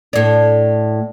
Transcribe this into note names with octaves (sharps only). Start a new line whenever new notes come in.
A2 D4